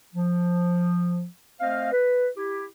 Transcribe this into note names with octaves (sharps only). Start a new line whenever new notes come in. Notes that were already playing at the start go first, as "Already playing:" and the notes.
F3
A3 C4 C5 D#5 F5
B4
E4 G4